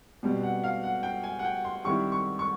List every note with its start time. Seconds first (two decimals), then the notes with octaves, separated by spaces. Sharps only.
0.23 B2 G3 C4
0.43 F#5
0.64 F5
0.83 F#5
1.03 G5
1.23 G#5
1.39 F#5
1.45 G5
1.65 C6
1.84 D#3 G3 C4 E4 C#6
2.12 C#6
2.39 C#6